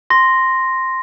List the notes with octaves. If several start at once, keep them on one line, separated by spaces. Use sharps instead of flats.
C6 A#6